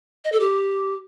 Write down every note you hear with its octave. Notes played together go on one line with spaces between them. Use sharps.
D#5
A4
G4